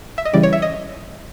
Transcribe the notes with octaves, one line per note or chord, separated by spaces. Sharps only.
E5
D#5
C#3 E3 G3 D5
C#5
E5
D#5